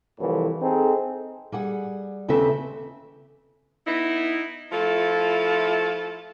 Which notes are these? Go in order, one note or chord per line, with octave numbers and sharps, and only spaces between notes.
C2 A2 E3 F3 A3
C4 D#4 G#4 A4
G3 G#4 F#5
D#2 C#3 C4 A4 B4 E5
B3 D#4 E4
F3 A3 E4 F4 A4